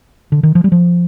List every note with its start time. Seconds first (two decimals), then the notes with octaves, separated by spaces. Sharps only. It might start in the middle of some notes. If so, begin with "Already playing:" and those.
0.32 D3
0.43 D#3
0.55 F3
0.64 G3
0.72 F3